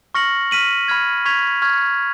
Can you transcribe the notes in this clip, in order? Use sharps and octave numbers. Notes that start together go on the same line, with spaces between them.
C#6 F6 A#6 C#7 F#7
F6 B6 D#7 F#7
B5 F6 G#6
C#6 G#6 B6 F7
C#6 F6 G#6